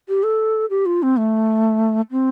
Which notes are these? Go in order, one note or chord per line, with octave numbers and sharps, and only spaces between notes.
G4
A4
G4
F4
C4
A3
C4